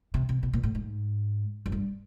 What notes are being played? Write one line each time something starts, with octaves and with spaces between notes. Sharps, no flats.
C3
C3
B2
A#2
A2
G#2
F#2
G2